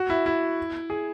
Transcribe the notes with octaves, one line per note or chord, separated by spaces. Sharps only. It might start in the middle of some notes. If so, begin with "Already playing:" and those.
Already playing: F#4
E4
E4
G#4